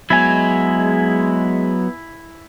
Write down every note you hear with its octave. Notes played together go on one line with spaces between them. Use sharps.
F#3 G#3 B3 E4 G#5